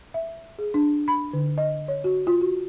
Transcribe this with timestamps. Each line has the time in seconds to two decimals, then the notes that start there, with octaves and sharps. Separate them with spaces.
0.14 E5
0.59 G#4
0.74 D4
1.08 B5
1.33 D3
1.58 D#5
1.88 C#5
2.04 F#4
2.27 F4
2.41 F#4